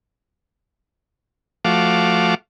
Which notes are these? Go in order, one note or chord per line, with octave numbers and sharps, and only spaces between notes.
F3 A3 F#4 F5 D6